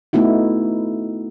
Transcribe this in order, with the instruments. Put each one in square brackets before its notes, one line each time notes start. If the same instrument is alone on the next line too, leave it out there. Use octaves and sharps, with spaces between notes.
[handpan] A3 B3 D#4 E4 F#4